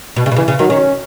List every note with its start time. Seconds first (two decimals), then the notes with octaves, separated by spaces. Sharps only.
0.16 B2
0.26 C#3
0.31 B2
0.36 C#3 E3
0.48 C#3
0.59 D#3 F#3
0.70 D#3 C#4